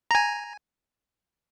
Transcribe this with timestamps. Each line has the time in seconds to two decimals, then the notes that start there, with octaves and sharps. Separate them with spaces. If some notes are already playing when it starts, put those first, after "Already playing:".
0.11 G#5 A#5